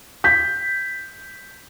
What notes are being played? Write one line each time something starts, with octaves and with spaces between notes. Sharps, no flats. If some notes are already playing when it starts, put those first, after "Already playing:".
G6 B6